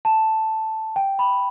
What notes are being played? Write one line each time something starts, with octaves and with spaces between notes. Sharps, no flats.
A5
G5
B5